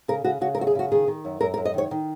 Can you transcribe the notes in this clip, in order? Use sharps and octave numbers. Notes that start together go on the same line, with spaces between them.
C#3 A#4
C#3 F#4
C#3 F#4
A#4
F#2 F#4
G#4
C#3 F#4
D#3 G#4
D#3
F#2
F#2 A#4
A#4
F#2
D#5
D#3 C#5
D#3